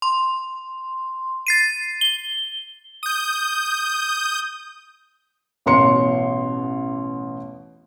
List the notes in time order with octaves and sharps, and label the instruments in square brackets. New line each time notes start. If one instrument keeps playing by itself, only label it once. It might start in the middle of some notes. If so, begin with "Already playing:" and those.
[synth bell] C6
A6 C7 D#7
G7
[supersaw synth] D#6 G6
[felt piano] A1 B2 C#5 C6 C#7